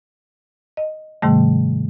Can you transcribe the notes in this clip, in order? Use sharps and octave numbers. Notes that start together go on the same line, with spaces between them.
D#5
G#2 C3 D#3 G3 A3